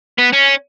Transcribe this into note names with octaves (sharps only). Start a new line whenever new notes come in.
B3
C#4